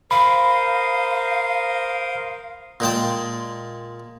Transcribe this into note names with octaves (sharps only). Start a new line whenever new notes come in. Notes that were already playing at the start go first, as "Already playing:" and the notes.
A#4 C5 F5 B5 D#6
A#2 G#3 G5 A5